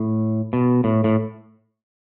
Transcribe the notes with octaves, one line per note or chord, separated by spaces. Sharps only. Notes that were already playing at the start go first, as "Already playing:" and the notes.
Already playing: A2
B2
A2
A2